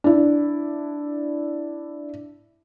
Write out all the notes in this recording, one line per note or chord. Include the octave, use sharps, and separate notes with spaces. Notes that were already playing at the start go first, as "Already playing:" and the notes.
D4 E4